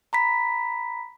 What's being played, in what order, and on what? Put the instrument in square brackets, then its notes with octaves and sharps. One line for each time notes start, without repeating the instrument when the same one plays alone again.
[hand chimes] A#5 B5 B6